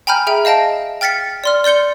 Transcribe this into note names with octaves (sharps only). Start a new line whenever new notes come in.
G5 G#5 A#5 B5 F6 G6
G#4 E5 G5
D#5 F5 A5 A#6 D7
G5 F6 A6 B6 C#7
D5 C6 F6
D5 C6 G6 C#7 G7